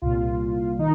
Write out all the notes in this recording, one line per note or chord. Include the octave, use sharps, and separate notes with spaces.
C2 A#2 F4
D#3 D#4